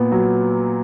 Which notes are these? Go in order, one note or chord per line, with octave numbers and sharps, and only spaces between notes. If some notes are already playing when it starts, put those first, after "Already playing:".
Already playing: A#2 B3
F#3